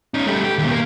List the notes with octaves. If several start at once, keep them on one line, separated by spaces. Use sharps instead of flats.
C#4 D#4
G3 A3
G4
D#2 B2
A#3